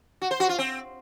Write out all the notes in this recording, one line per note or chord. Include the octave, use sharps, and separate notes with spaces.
F#4
C5
F#4
F4
C4